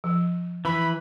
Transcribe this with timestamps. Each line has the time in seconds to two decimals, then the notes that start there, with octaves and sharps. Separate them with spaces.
0.04 F3
0.65 E3 B5